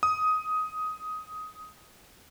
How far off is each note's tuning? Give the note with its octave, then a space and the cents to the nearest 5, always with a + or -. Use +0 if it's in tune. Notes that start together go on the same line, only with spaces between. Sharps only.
D#6 +10